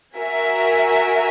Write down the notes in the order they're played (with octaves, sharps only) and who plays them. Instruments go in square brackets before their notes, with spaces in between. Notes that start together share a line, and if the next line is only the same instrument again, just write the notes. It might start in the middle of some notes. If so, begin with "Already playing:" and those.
[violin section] F#4 A#4 E5 G#5